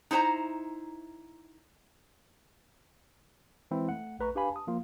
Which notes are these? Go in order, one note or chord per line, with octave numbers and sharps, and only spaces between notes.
D#4 E4 C5 A5 A#5
E3 G#3 C4 E4
A3 F#5
A#1 A3 B4 A#5 C#6
D4 G4 B4 F5 G#5 B5
A5 D#6
F3 A#3 F4